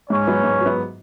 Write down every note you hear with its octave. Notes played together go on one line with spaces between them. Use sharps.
G#2 C#4 C#5
F#3 B3
G#2
F#3 B3